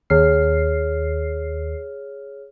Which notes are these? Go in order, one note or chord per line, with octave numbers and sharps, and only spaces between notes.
D#2 G#4 C#5 F6 C7